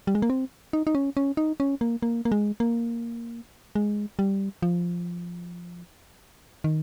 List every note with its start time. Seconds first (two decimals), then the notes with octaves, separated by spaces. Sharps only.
0.07 G3
0.15 G#3
0.22 A#3
0.30 C4
0.73 D#4
0.87 D#4
0.95 C#4
1.17 C#4
1.37 D#4
1.60 C#4
1.81 A#3
2.02 A#3
2.25 A#3
2.32 G#3
2.60 A#3
3.75 G#3
4.19 G3
4.62 F3
6.64 D#3